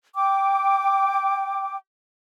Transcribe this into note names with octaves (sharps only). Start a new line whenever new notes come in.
G5 D6